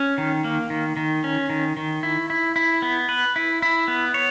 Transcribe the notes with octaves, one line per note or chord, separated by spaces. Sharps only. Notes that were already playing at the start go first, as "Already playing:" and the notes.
Already playing: C#4
D#3
A#3
D#3
D#3
C#4
D#3
D#3
E4
E4
E4
B3
B4
E4
E4
B3
C#5